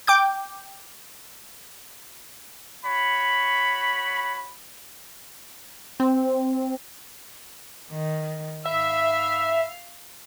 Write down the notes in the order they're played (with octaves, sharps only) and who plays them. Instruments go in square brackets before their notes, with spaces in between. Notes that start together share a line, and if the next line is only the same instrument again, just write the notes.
[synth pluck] G5 D6 G6
[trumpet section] F#4 C#5 B5
[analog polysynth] C4
[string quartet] D#3
[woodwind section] G#2 B5 E6 [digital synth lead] E5 [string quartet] F5